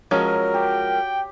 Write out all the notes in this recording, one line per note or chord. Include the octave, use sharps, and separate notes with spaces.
F3 F#3 G#3 C#4 A#4
G4 G5